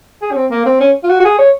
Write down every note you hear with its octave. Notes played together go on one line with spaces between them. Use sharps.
G#4
C#4
C4
A#3
C4
C#4
F4
F#4
F#4
G#4
C#5